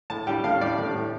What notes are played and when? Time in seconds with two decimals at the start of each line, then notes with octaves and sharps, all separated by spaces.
0.10 A2 A5
0.27 G3 G5
0.44 A2 F5
0.61 G3 D5
0.78 A2
0.96 A2